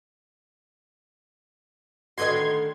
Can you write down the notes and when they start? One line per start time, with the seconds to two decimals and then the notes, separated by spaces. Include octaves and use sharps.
2.18 A2 D3 D#3 F#4 B4 D#5 C6 G#6